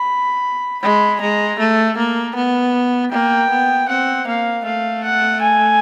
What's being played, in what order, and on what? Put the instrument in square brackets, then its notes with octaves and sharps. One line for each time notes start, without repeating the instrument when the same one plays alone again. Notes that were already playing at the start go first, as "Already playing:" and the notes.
Already playing: [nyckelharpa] B5
[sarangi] G#3 [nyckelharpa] B5
[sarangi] G#3 [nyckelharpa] A#5
[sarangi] A3
A#3
B3
[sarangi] A#3 [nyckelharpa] G5
[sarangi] B3
[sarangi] C4 [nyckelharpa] F#5
[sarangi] A#3 [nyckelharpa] F5
[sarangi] A3 [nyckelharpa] F5
[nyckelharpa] F#5
G#5